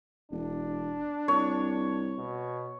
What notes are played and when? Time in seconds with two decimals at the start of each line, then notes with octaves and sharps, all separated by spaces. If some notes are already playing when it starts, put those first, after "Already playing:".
0.32 E1 D4
1.28 C2 C#5
2.17 B2